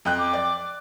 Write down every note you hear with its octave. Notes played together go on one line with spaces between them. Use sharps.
F2 G5 F#6
D6
D5